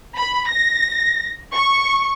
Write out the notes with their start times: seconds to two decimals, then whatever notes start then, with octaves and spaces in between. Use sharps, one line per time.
0.16 B5
0.49 A#6
1.52 C#6